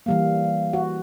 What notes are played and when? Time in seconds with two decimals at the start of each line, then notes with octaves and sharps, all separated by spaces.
0.06 E3 G3 A#3 F5
0.73 F#4